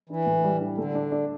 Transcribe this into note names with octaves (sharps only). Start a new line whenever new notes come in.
E3 D4
A2
G3
D4
D3 A3
D4
D4